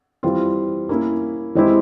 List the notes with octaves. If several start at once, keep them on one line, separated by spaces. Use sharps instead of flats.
E3 G3 C4 F4
A#3 C#4 E4
E3 G#3 C4 E4 G4